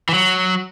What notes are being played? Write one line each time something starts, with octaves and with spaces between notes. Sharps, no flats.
E3
F#3